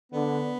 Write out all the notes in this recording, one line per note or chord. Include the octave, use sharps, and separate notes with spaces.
D3 B3